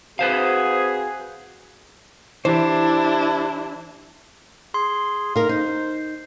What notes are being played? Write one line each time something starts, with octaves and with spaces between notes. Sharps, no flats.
C4 F#4 G#4 B4 C5 F5
E3 D4 E4 G4 C5
G#4 C6
D#4 A#4 F5
D#4 C5